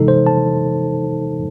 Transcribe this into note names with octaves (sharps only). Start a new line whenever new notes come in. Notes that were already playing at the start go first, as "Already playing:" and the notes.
Already playing: C3 E3 G#3 D#4 A4
C5
A5